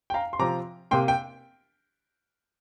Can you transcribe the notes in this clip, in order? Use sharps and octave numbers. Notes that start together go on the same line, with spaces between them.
G5
F5 A#5
C6
C3 F3 C4 A#5 D6
C3 A#3 G5 C6
G5